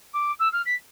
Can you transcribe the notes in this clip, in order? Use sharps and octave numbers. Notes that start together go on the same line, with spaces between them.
D6
E6
F6
B6